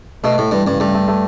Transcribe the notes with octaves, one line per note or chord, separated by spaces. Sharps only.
B2 A3
A2 A3
G2 E3
G2 C#3
G2 A3
A3
A3